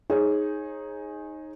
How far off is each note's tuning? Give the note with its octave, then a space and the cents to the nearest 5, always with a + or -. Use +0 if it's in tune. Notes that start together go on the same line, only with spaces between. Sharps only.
D#4 +0 G#4 +0 C#5 -40